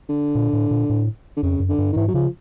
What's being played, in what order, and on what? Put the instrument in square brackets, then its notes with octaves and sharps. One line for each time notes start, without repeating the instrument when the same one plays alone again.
[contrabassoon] D3
[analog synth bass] A#2
A2
A#2
A2
[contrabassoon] D3
[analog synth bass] F2 [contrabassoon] C#3
[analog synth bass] F#2
[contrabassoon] D3
[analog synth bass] G2
[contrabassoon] D#3
[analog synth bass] G#2 [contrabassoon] E3
[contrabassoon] F#3
[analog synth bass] C#3 [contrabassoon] F3